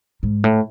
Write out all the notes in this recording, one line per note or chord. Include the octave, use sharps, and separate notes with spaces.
G#2
A2